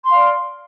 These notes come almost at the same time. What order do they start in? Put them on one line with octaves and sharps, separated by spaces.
C6 F5 D5